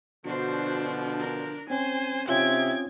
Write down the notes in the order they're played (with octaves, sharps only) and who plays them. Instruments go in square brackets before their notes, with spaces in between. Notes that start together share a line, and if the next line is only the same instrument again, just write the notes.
[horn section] B2 D3 F3 [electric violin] D4 [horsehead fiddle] F#4 C5
[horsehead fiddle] A#4
[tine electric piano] C4 C#4 [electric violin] C5 [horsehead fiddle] G#5
[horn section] C3 E5 [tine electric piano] C4 C#4 F4 [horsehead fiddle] D#4 G5 [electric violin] G#6